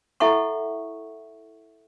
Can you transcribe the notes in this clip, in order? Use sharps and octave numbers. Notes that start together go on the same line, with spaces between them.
E4 A4 E5 F#5 C#6